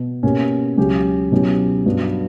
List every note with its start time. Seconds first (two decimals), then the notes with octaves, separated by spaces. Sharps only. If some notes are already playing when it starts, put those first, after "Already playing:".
Already playing: B2
0.23 B2 A#3 C#4 G4
0.77 C#2 C#3 F#3 C#4 G4
1.32 B2 F#3 C#4 E4 G4
1.85 G2 F#3 B3 F#4